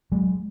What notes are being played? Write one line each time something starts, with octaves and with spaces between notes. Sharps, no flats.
F#3 G#3